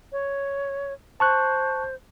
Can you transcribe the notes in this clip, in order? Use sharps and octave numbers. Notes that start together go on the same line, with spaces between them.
C#5
C5 A5 C#6 F#6